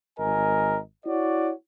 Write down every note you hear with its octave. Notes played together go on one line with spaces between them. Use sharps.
G#1 A#4 D#5 G#5
E4 F#4 C#5 D5